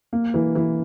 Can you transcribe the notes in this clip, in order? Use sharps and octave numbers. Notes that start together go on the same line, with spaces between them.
A#3
E3
E3